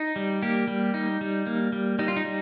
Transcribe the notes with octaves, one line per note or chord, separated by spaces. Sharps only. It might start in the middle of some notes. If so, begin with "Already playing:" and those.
Already playing: D#4
G3
A#3 G4
G3
D#4
G3
A#3
G3
G3 D#4
F4
D#4
G3